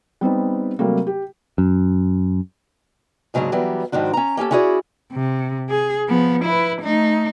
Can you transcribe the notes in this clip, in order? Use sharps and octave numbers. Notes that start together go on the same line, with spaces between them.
G3 B3 C4 D#4
C3 F#3 G3 A3 A#3
G4
F#2
G#2 C#3 F#3 A#3 D4 G#4
E3 F#3 G3 B3 D5
G#2 D#3 F3 D4 F#4
C#4 A#5
A#3 C#4 G4 A4
C#4 E4 F#4 G#4 B4 D5
C3
G#4
F3 B3
E4 B4
A3 D#4